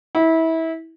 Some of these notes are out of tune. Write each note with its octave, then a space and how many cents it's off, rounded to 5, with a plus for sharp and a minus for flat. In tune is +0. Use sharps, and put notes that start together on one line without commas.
E4 -25